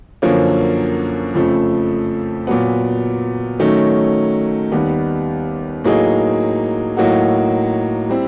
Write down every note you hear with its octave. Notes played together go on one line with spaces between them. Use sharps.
F#2 D3 F3 A#3 C#4
F2 C#3 F3 A3
A#2 F#3 B3
D#3 F#3 A3 C#4
D#2 D#3 G3 B3
A2 F#3 A#3 D#4 G#4
A2 F#3 A#3 D#4 F#4
G3 C4 E4